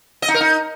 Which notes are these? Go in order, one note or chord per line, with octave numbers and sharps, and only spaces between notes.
D#5
D#4
A#4
D#4